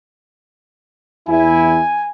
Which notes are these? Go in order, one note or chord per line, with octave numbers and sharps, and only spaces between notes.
E2 E4 G#5